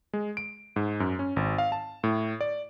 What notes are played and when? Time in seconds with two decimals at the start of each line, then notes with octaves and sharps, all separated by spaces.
0.13 G#3
0.37 D7
0.76 G#2
1.00 F#2
1.19 C#4
1.36 G#1
1.58 F5
1.72 A5
2.04 A2
2.41 D5